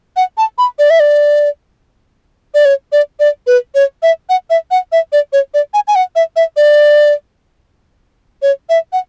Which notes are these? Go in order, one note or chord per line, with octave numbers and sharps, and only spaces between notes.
F#5
A5
B5
D5
E5
D5
D5
C#5
D5
D5
B4
C#5
E5
F#5
E5
F#5
E5
D5
C#5
D5
G#5
G#5
F#5
E5
E5
D5
C#5
E5
F#5